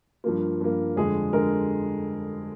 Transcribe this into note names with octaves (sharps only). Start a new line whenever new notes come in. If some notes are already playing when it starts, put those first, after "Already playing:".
G2 F3 A#3
G2 F3 A#3
F2 D3 G#3 G#4
D3 G#3 A#4